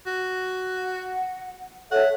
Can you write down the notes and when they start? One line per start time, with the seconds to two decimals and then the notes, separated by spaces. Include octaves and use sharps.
0.06 F#4
0.77 F#5
1.91 A4 C#5 E5 F#5